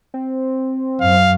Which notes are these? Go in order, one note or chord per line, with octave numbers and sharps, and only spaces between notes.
C4
F#2 F5